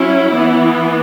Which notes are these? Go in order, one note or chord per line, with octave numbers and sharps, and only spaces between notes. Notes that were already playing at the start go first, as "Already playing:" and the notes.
Already playing: F#3 C#4 E4
E3 B3